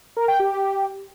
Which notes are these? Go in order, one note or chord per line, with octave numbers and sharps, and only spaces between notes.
A#4
G5
G4